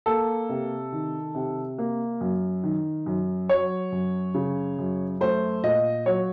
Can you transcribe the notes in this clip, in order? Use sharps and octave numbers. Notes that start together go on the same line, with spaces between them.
A#3 A4
C3
D#3
C3
A#3
F#2
D#3
F#2
F#3 C#5
F#2
C#3
F#2
A3 C5
A#2 D#5
F#3 C#5